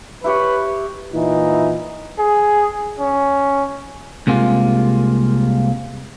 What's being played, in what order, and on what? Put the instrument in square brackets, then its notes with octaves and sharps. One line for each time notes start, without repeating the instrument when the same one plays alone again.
[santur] E4 G4 C#5 [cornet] B4
[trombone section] A#2 E3 D#4 E4
[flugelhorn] G#4
C#4
[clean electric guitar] C2 C3 G#3 A#3 F4